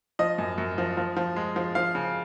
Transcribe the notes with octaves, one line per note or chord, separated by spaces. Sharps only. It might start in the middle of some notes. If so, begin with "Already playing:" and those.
F3 D#5
F#2
F#2
F3
F3
F3
G#3
F3
F3 F5
C#3